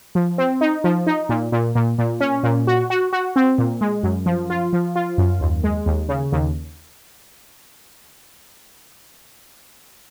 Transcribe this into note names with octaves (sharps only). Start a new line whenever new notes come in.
F3
C4
D#4
F3
D#4
A#2
A#2
A#2
A#2
C#4
A#2
F#4
F#4
F#4
C4
A#2
G#3
F#2
F3
F4
F3
F4
F#2
D#2
G#3
D#2
C#3
D#2